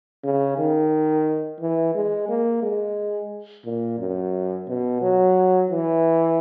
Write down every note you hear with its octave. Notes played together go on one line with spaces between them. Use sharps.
C#3
D#3
E3
G#3
A#3
G#3
A#2
F#2
B2
F#3
E3